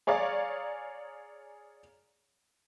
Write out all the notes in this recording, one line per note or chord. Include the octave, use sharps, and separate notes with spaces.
G#4 C#5 D5 F5 A#5